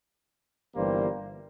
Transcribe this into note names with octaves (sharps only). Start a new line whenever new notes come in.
G1 G2 E3 G3 A#3 C5